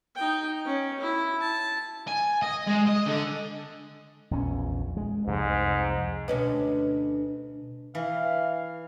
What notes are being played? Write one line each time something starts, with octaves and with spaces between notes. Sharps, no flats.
D#4 G5
C#4
E4
A5
G#5
D#5
G#3
D#5
D3
A#1 E2 C#4
G#3
C2 F2 G#2
D2 B2 C#4 D4 B4 D#5
E3 F5